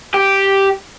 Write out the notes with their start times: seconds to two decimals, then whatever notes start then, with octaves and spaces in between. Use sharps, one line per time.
0.14 G4